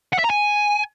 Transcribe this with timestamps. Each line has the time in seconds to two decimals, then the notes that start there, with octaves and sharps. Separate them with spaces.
0.13 F#5
0.19 E5
0.24 A#5
0.30 G#5